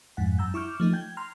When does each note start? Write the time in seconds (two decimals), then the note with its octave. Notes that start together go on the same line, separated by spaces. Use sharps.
0.17 F2 G#2 F#5
0.39 F#2 A#5 E6 G6
0.54 E4 C#6 D6 F6 G6
0.80 F3 A3 D#4
0.93 G5 G6 G#6
1.17 A#5 C6 F6